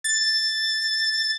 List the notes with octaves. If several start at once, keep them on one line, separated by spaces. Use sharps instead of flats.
A6